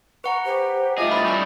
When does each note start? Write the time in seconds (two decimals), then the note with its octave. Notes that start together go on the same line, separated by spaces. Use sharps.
0.24 B4 F#5 A#5 C#6
0.45 G4 C5
0.98 A2 F4 G#4 D#5 E5 D6
1.11 B5 D#6 A6
1.25 G3 C4 D4 B5 C#6 G6